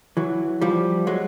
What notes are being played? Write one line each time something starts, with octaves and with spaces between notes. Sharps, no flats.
E3 F#3
F3 G3
F#3 G#3